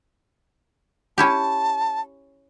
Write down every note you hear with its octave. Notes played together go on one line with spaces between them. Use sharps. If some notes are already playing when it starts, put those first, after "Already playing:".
C#4 E4 G4 A5